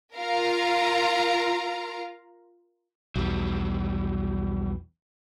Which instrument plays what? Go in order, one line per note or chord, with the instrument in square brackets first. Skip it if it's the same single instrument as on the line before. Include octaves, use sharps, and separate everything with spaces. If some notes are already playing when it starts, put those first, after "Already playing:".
[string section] F4 A#4 F5 A#5
[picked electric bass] B1 E2 [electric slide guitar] F#3 G3